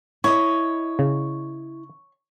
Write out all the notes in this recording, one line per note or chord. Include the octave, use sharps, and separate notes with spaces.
E4 C#5 D#5
C#3